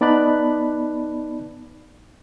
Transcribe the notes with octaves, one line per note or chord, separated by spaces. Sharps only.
B3 D#4 D5 A5 B5 F#6